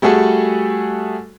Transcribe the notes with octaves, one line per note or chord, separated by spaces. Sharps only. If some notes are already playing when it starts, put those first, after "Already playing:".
G3 A3 F#4 G#4 A4